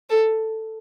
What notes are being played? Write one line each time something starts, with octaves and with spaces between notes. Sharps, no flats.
A4